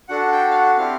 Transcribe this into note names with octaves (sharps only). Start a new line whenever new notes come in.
D4 F#4 A4 F#5
G5
F5
F#5
C4 E4 G4 F5